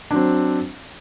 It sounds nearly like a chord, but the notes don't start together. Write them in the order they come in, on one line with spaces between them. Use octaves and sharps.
D4 F#3 C4